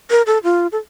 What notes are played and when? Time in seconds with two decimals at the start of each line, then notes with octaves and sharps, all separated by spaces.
0.10 A#4
0.27 A4
0.44 F4
0.72 A4